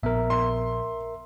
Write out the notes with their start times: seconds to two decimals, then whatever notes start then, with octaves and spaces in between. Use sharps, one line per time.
0.03 A#1 B3 A#4 E5
0.30 C6